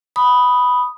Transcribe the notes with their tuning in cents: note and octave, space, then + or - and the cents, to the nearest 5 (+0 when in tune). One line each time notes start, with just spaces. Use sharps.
B5 +0 D#6 +0